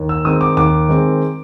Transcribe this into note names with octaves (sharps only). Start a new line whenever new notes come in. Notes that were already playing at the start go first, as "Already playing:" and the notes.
Already playing: D#2
E6
D#3 G#3 C4 D#6
D6
D#2 D6
D#3 G#3 C4